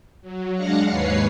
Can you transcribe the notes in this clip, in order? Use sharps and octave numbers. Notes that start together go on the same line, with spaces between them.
F#3
G#3 D4 F5 F#5 A#6 C#7
D#2 G#2 B4 C#5 C7